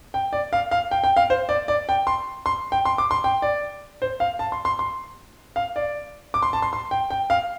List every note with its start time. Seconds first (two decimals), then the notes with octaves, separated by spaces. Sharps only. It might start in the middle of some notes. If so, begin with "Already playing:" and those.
0.14 G5
0.33 D5
0.53 F5
0.71 F5
0.91 G5
1.04 G5
1.17 F5
1.30 C5
1.49 D5
1.68 D5
1.89 G5
2.07 C6
2.46 C6
2.72 G5
2.85 C6
2.98 D6
3.11 C6
3.24 G5
3.42 D5
4.02 C5
4.20 F5
4.39 A5
4.52 C6
4.65 C6
4.79 C6
5.56 F5
5.76 D5
6.34 D6
6.43 C6
6.53 A5
6.62 C6
6.73 C6
6.91 G5
7.10 G5
7.30 F5